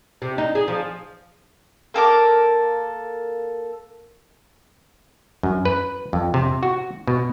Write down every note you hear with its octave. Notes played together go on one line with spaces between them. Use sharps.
C3
D#4
G#4
F3
A#3 A4 A#4 D6
F#2
B4
F2
C3
F#4
B2